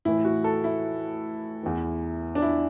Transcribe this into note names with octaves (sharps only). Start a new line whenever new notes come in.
A2 E3 E4
F#4
A4
E4
E2 E3
D4
E4